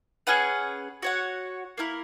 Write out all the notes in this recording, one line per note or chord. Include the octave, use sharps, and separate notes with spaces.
C#4 G#4 B4 F#5
F#4 C#5 F#5
A#3 E4 A#4